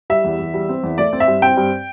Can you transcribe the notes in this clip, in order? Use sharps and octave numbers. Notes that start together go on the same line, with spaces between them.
G3 E5
E2
E2
G3
C4
E2
A3 D5
C4
E5
G2
C4 G5
G2